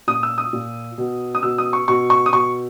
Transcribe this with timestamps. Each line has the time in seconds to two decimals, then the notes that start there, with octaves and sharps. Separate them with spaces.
0.07 A#2 D#6
0.23 E6
0.38 D#6
0.53 A#2
0.98 B2
1.35 D#6
1.42 B2 E6
1.58 D#6
1.73 C#6
1.88 B2 C#6
2.10 C#6
2.26 D#6
2.33 B2 C#6